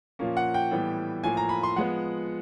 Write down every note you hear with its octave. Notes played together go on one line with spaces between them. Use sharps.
A#2 F3 A#3 C#4
F#5
G5
A2 E3 G3 B3
A2 F3 A#3 G#5
A#5
B5
C6
F3 G#3 B3 F#5